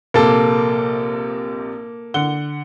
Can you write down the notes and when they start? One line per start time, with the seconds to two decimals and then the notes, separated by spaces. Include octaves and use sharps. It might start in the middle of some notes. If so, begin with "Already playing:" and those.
0.14 A#1 C3 A#3 A4
2.14 D3 F#5 G7